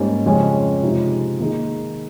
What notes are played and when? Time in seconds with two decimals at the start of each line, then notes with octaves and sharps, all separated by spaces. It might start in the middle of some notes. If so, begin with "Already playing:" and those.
Already playing: G#2 G3 A#3 C#4
0.26 F2 C#3 G#3 C#4
0.83 C3 F3 G#3 D#4 G4
1.40 D#3 A#3 D#4 G#4